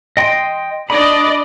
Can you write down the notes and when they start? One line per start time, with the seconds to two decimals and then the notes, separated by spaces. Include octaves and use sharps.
0.17 D#5 G5 C6
0.90 D4 D5 D#5 B5